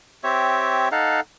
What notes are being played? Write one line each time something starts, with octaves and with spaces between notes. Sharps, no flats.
C4 G4 C#5 E5
D#4 A4 F5 F#5